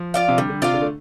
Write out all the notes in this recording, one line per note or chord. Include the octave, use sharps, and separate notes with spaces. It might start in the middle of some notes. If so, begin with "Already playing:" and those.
Already playing: F3
F4 D5 F5
C3
D3 G3
D3
C3 F4 D5 F5
D3
A3